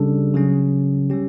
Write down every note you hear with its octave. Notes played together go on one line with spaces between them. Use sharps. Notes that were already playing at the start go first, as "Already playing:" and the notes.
Already playing: C#3 G3 D4 A4
C#3 F#3 C#4
G3 C#4 G4